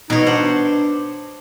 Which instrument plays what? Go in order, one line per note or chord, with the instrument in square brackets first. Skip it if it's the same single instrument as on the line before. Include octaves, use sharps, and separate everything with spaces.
[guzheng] B2 C#5 [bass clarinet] D#4
[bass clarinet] D4 [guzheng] C5 F#5